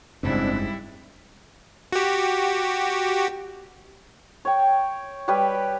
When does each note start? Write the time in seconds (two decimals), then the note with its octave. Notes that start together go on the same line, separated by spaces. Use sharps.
0.23 F#1 G#2 C#3 G3 C4 D4 E4
1.93 F#4 G4
4.45 C#5 G5
5.28 G3 G4 B4 C#5